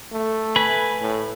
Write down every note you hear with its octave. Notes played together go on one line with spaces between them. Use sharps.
A3
B4 G#5 B5
A2